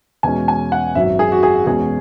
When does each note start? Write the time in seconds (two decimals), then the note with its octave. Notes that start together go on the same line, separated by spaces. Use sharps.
0.23 E2 B2 G#3 C#4 G#5
0.48 G#5
0.72 F#5
0.95 G#1 F#2 F#3 E5
1.19 G#4
1.32 F#4
1.43 G#4
1.66 E2 B2 G#3 C#4 G#4